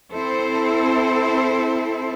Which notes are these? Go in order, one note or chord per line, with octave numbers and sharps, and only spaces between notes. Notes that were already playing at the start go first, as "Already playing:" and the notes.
C4 E4 A4 C5